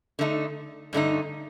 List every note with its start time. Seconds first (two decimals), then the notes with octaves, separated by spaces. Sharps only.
0.19 D3 A3 D#4
0.93 G2 D3 A3 D#4